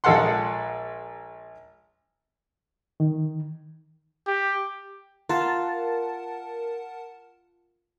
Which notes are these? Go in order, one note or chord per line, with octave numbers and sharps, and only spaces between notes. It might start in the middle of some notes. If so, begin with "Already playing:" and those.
A#1 G#3 A4 F5 F#5 C6
D#3
G4
F4 A#4 F#5 A5